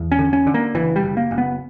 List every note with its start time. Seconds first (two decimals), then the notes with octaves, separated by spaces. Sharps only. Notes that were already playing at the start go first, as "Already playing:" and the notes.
Already playing: E2
0.12 C#4
0.19 D3
0.33 C#4
0.47 D3
0.54 A#3
0.74 F#1 E3
0.96 G3
1.03 F#1
1.17 A#3
1.31 F#1
1.38 B3